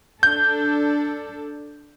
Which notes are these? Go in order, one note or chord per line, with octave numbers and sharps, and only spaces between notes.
D4 A4 G6